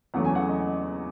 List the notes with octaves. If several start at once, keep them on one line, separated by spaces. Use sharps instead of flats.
E2 C#3 F#3 A3 F#5
G#5
F#5
D#5